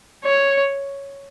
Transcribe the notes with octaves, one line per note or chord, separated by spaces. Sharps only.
C#5